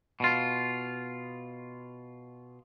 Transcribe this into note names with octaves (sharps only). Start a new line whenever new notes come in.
B2 F4